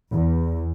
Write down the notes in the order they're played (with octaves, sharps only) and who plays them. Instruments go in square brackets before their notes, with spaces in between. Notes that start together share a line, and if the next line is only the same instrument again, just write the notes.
[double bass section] E2